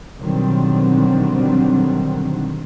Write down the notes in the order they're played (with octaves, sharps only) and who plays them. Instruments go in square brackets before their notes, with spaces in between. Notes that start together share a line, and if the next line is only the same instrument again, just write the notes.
[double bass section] B2 D3 D#3 F#3 G3 C4